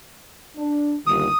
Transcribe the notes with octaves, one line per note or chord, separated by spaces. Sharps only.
D4
G1 D#2 D#6